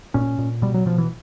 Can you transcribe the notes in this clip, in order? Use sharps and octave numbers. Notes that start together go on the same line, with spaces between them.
A#2 C#4
A#2
B2 G3
F#3
B2 F3
E3